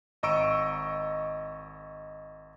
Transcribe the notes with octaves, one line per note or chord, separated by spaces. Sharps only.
G#1 D#5 A#5 C#6 E6 D7